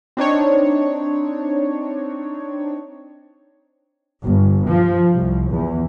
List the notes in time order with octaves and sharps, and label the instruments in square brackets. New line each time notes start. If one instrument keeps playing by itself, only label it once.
[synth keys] C4 D4 D#4 C#5
[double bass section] G1
F3
C2
E2